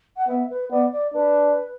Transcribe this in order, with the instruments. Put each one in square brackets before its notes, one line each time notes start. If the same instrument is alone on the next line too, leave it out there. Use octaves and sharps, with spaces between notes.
[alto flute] F#5
[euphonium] B3 [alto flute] E5
[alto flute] B4
[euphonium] B3 [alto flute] D5
[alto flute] D5
[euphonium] D4 [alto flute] B4